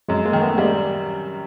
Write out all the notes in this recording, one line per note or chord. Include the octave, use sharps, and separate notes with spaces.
F#2 F#3 G#3
G#3 A#3
D#3
A3 B3
G3 G#3 A#3